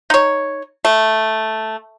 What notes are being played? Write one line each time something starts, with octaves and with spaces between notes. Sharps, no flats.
D#4 C#5
A3